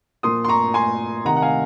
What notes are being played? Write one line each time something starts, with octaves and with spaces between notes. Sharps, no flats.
A#2 F3 C6 D#6
C6
A#5 C#6
G#5 C6
C3 D#3 F#5 A#5
F#5
F5 G#5